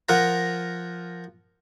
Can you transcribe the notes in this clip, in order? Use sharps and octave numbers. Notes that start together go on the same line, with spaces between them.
F3 A#4 F#5 A#5